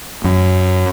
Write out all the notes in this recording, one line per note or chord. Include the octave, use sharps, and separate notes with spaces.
F#2